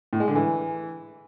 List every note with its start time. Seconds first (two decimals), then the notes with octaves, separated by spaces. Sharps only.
0.13 A2
0.20 G#3
0.28 D3
0.35 E3